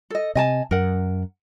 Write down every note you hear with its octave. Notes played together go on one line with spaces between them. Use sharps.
A4 D#5
C3 D#5 G#5 A5
F#2 A#4 F#5